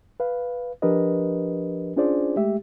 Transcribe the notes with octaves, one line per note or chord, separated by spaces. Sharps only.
B4 F5
F3 D4 G4 A#4 B4 D#5
C#4 D4 F4 G#4 C5 D5
G#3 A3 G4 E5